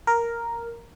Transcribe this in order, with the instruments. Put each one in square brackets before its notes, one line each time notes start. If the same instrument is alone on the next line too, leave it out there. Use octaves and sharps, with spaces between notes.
[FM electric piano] A#4